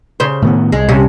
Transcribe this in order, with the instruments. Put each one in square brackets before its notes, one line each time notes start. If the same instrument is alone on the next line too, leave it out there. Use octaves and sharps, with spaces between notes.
[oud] C#3 C5
[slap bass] A2 D#3 B3
[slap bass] C2 [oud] G#3
[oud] G2 C3 C#4